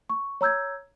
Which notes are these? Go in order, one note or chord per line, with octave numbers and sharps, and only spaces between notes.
C#6
C#5 A#5 E6 G6 G#6